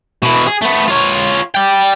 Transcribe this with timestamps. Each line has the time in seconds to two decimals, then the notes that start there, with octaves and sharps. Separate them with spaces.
0.23 B2 E4
0.47 G#4
0.62 A3 B3
0.88 F4 C#5
1.55 D5 G5